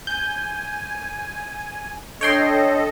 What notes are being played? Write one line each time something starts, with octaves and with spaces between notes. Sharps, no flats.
G#5 G6
D4 A4 C#5 D#5 G5 C6